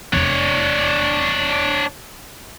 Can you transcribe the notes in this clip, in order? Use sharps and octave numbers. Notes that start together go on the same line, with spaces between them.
F1 E2 D4 C#5